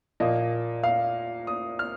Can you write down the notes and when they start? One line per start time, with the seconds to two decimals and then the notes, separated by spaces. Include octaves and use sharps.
0.20 A#2 F3 A#3 D#5
0.83 F5
1.47 D#6
1.79 F6